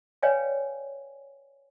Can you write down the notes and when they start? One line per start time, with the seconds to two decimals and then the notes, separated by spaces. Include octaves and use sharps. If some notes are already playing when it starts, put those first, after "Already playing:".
0.23 B4 C#5 D5 F5 G5 G#5